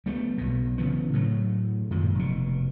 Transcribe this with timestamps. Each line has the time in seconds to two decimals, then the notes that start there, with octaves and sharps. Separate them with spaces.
0.06 G3 A3 B3
0.38 B1 B2
0.78 C#3 E3 B3
1.13 A2 F#3 A3
1.91 F#2 A#2 D#3 G#3
2.15 F1 B2